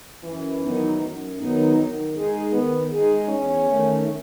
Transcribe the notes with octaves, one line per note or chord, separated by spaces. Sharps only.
F#2 E3
D#3 F#3 B3 D#4
F#2
D#3 F#3 B3 D#4
D#3
G#3 D#4 G#4
D#3 B3
G#3 D#4 G#4
E2 C#4
D#3 A3